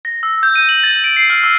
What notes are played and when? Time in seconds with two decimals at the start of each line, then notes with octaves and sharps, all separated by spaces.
0.05 A#6
0.23 E6
0.43 G6
0.56 D#7
0.69 F#7
0.84 A6
1.04 D7
1.17 C7
1.30 F6
1.44 E6